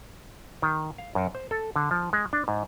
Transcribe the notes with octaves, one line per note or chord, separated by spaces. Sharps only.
D#3
F5
F#2
C5
A4
D3
F3
G#3
D4
G#2